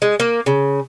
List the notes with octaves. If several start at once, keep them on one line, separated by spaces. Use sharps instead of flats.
G#3
A#3
C#3